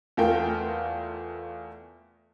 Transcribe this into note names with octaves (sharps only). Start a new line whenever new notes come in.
E2 A3 F4 A#4 G5